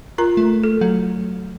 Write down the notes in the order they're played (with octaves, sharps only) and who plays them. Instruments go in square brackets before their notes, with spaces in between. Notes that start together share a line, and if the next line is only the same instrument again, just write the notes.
[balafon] F4 A#4 A#5
[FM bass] A3
[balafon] A4
[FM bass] F#3 [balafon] A3